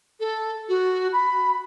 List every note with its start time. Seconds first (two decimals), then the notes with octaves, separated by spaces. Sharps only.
0.20 A4
0.69 F#4
1.12 B5